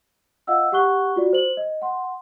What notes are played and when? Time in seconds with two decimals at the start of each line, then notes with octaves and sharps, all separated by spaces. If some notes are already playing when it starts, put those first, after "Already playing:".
0.47 F4 D#5 F5 F#5 E6
0.72 G4 F#5 C#6 F#6 G7
1.16 F4 F#4 D5
1.33 C5 F#7
1.57 D#5
1.82 F#5 C6